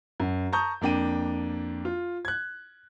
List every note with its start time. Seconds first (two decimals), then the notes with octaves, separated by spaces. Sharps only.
0.20 F#2
0.52 A5 A#5 C#6 D#6 G6
0.81 F2 A#3 D4 G5 D#7
1.85 F4
2.25 F#6 G#6